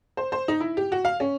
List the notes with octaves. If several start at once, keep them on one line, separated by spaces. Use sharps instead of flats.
C5
C5
D#4
E4
G4
F#4
F5
C#4